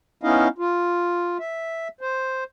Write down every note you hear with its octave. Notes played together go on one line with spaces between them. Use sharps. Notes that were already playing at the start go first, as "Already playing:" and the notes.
B3 C#4 D#4 E4 D#5 F5
F4
E5
C5